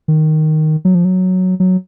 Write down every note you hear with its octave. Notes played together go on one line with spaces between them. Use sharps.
D#3
F#3
F3
F#3
F#3